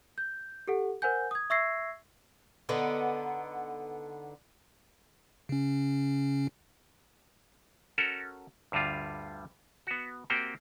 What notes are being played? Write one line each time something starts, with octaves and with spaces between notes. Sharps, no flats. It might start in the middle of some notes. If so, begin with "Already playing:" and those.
G6
G4 A4 F#5
A#4 C5 F#5 G#5 G6
D#6 G#6
E5 C#6 E6 G#6 A#6 C7
D3 B3 D#4
C#3 C#4
C#4 F#4 A4 A#4
D2 G2 D3 G3 F4
B3 F#4
A#3 C4 F#4 G4 G5